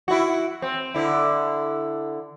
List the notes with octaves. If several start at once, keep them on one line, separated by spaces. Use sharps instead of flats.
E4 F#4
C4
D3 E4